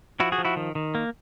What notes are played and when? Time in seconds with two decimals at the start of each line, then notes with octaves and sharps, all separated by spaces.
0.20 F3 E4 F#4
0.32 F#4 G#4
0.38 F3
0.45 E4 F#4
0.57 D#3
0.75 D#3
0.95 A#3